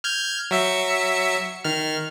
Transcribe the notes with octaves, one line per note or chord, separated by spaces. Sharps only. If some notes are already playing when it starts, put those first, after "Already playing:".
F6 G6 G#6
F#3 E5 C#7
D#3 F6